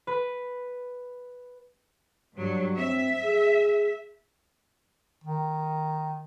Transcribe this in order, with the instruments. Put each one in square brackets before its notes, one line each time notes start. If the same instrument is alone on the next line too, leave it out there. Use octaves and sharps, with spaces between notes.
[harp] B4
[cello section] G2 F#3 [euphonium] G3
[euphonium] C4 [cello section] E5
[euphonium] G#4
[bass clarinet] D#3